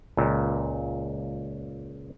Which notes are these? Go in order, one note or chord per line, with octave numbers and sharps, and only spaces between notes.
C#2 A#2